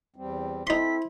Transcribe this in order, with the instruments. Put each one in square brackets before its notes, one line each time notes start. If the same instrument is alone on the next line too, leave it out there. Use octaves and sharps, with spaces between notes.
[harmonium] E2 G3 C4
[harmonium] C4 A4 [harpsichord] D#4 C6 [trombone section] E4 C5 [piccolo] B6